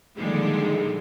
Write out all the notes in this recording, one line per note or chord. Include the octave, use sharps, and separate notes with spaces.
A#2 D3 D#3 F3 G3 G#3